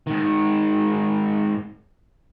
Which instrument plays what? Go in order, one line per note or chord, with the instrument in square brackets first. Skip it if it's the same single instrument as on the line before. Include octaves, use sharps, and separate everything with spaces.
[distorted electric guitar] G#2 D#3